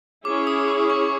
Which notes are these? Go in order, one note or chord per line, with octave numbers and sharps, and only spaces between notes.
C#4 E4 G#4 C#5 D6
D#6
D6
C#6